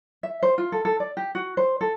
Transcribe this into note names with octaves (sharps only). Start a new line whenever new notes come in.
E5
C5
F4
A4
A4
D5
G4
F#4
C5
A4